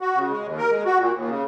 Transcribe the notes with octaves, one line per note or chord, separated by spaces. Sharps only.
F#4
C#3
G#3
D#2
A#4
G#3
F#4
A#2
D#2
C#3